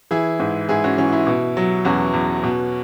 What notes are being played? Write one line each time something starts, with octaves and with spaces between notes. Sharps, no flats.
E3 E4 G#4
G#2
G#2 E4 G#4
C#4 F#4
E3 C#4
E4
B2
F#3
E2 C#4 F#4
E2
B2